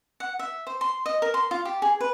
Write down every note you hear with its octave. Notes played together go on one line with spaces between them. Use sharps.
F#5
E5
C5
C6
D#5
A#4
C6
F4
G4
G#4
B4